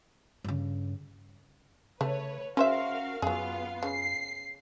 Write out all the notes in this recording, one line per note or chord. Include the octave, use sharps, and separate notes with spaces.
G2 C#3
C#3 A3 B4 C#5
C#3 C#4 F#4 A#4 C5 E5 F5
F#2 F#3 B3 F4 G#4 F5
C#3 C7